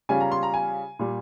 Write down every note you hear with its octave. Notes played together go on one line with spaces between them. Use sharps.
C#3 G3 C#4 F4 G#5
A#5
C6
A#5
G#5
A#2 G3